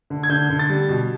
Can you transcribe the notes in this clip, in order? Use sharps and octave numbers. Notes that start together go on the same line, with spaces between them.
D3
G#6
D3 G6
D3
A6
G3
B2